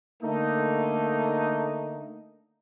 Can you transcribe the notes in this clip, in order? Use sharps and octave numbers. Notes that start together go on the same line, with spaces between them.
D3 A3 A#3 D#4